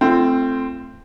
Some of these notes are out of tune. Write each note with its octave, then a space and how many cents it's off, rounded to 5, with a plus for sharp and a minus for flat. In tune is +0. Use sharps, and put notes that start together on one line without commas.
A3 +0 C4 +0 F4 -35